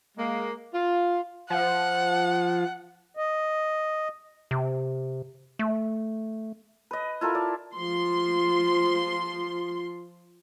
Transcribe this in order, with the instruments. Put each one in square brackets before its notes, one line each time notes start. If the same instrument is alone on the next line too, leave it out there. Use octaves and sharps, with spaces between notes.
[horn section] G#3 A#3
F4
[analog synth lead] F3 [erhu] F#5
[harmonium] D#5
[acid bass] C3
A3
[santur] B4 D#5
E4 F4 A4 A#4
D5
[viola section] F3 C6